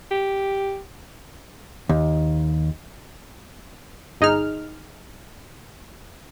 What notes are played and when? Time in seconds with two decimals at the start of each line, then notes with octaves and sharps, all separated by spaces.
0.11 G4
1.89 D#2
4.21 G1 D#4 G#4 F6